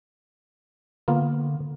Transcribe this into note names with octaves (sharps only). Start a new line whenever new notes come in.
D3 A#3 B3 F4